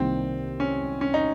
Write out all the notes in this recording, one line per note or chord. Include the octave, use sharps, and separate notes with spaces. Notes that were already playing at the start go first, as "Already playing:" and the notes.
Already playing: C2 C3 D#3 A#3 C4
C#4
C#4
D#4